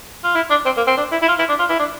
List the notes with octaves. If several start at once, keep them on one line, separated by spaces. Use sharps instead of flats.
F4
E4
D4
C4
A#3
C4
D4
E4
E4
F4
E4
D4
F4
E4
D4